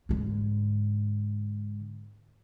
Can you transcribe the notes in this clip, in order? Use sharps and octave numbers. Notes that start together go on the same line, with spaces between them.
G#2 D3